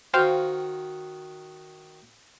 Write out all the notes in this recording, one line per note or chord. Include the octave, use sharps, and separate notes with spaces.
D#3 F#4 C5 F5 G5